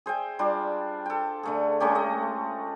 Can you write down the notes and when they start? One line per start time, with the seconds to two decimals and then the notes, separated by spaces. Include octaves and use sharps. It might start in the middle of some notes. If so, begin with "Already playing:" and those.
0.06 G#4 C5 E5 G5
0.39 G3 D4 F4 G4
1.06 A4 G5
1.43 D3 A3 G#4
1.80 G#3 A3 C#4 G4
1.95 D#5